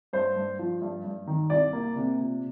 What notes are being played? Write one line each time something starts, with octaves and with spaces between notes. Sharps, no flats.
G2 C5
G2
F3
G2
G2
D#3
C2 D5
A#3
C3
A#2